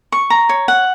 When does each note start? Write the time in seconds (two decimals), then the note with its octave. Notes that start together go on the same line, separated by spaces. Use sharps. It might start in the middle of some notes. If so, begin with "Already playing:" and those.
0.12 C#6
0.30 A#5
0.49 C#5
0.68 F#5